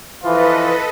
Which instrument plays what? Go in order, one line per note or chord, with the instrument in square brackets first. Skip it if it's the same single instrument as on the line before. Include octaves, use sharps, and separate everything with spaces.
[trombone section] E3 F3 F4 [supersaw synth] A4 B4 D#5